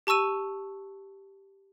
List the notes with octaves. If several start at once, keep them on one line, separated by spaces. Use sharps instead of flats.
G4 A5 C#6 E6 D#7